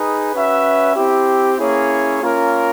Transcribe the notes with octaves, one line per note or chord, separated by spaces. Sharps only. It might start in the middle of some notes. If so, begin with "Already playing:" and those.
Already playing: D#4 G#4 B4
C#4 F#4 B4 E5
C4 E4 G4
A#3 C#4 E4 G#4 C#5
A#3 C#4 F4 A#4